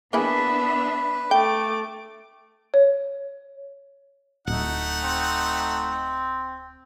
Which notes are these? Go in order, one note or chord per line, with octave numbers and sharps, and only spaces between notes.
A#3 B3 D4 E4 G#4 B4 E5
A3 G5 D6
C#5
D1 A3 D#4 F#5
C4